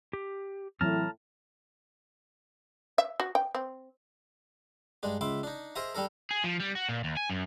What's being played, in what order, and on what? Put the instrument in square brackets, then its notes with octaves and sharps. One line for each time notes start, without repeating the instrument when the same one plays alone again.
[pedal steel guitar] G4
[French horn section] A2 [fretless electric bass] E3 F#3 C4 [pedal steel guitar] A5 A#5 F6
[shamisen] E5
F#4
G5
C4
[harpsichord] G2 G#3 D4
C#2 E5 B5 C6 D6
D4 D#4
G#4 A#4 C5 D#5 E5 A#5
G3 D4 A4 A#4
[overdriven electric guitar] G#4
F3
G3
F#4
A#2
D#2
G#5
F#2